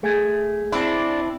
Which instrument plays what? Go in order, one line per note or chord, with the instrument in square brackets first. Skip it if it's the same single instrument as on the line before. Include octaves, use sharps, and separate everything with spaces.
[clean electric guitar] A3 [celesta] G#4 G#5 G#6
[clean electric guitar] C4 E4 [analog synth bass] D4